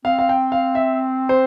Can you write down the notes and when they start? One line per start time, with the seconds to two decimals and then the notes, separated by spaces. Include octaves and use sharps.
0.05 C4 F5
0.19 F5
0.29 G5
0.52 F5
0.75 E5
1.29 C5